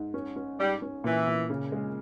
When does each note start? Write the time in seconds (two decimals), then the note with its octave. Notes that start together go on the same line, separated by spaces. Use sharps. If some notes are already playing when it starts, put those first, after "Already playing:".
Already playing: G#2
0.14 C#4
0.36 C#4
0.59 G#2 G3
0.82 C#4
1.04 A#2 E3
1.27 A#2
1.50 C#3
1.72 G#3